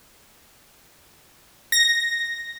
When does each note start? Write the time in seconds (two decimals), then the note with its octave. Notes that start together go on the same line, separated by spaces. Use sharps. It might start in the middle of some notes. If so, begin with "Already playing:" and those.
1.72 A#6